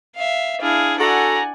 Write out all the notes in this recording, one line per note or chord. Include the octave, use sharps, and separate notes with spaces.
E5 F5
D4 E4 G#4 F5
F#4 A4 D5 F#5 G#5 A#5